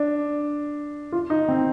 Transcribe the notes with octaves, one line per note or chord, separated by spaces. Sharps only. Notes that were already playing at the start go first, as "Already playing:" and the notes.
Already playing: D4
F4
D#4
C4